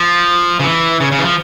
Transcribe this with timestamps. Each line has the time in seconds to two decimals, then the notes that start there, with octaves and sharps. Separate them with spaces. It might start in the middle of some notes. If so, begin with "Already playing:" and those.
Already playing: F3
0.59 C#3
0.64 E3
1.00 C#3
1.12 C#3
1.18 E3
1.24 F3